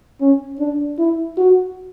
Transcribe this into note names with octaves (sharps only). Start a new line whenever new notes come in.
C#4
D4
E4
F#4